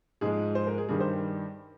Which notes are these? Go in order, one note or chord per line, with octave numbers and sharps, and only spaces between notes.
G#2 F3 G#3 G#4
C5
A#4
G#4
G2 D#3 G3 G#4
C5